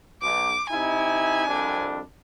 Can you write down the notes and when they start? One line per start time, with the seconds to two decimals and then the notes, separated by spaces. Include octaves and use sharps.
0.23 B1 D6
0.70 C3 D#4 E4 G#5
1.47 C2 F2 D4